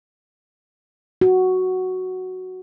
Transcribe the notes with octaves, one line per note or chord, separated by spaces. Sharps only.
F#4